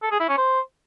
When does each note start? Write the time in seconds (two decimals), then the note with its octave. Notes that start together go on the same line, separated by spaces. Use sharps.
0.03 A4
0.11 G#4
0.20 E4
0.29 C#4
0.38 C5